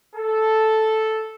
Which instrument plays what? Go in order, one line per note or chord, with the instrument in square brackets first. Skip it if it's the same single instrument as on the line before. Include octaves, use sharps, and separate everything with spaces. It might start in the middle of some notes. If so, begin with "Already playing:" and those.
[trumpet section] A4